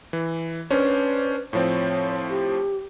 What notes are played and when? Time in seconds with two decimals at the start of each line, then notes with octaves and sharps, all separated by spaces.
0.13 E3
0.71 C#4 D4 B4 C5
1.53 A2 F3 C4 C#5
2.29 G4